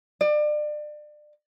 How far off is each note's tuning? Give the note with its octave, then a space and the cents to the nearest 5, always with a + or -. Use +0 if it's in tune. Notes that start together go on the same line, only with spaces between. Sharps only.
D5 +30